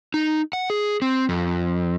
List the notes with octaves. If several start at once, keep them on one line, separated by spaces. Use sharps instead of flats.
D#4
F#5
G#4
C4
F2